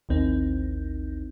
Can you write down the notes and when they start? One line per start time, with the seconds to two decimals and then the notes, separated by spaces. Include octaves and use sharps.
0.09 A1 D#2 C4 D#4